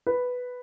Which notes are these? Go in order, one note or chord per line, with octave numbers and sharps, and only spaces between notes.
B4